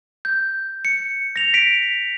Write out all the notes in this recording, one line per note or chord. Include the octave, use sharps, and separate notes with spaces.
G6
C#7
A#6 F7
B6 D7 F7